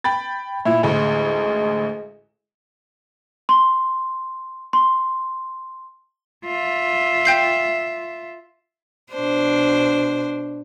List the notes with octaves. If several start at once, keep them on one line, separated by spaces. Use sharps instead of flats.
G5 B5 A6
A#2 E4
A1 D2 G#3
C6
C6
F4 E5
G5 G6 C7
B2 D4 C5